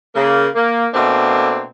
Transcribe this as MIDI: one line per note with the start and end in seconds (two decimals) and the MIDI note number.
0.15 0.47 49
0.15 0.47 58
0.55 0.86 58
0.94 1.63 47
0.94 1.63 57
0.94 1.63 58
0.94 1.63 60
0.94 1.63 62